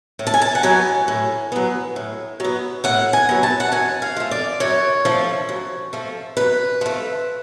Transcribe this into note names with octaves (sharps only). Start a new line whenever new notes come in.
A2
A5
G#5
A5
F#5
F#3 B3 G#5
A2
F#3 B3
A2
F#3 B3
A2 F#5
G#5
F#3 B3
A5
F#5
F#2 G#5
F5
F3 A3
D5
F#2 C#5
F3 A3
F#2
F3 A3
F#2 B4
F3 A3